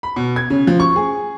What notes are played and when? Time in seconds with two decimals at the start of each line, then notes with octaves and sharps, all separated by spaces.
0.03 B5
0.16 B2
0.36 G#6
0.50 C#3
0.67 F3
0.80 C#6
0.96 G#4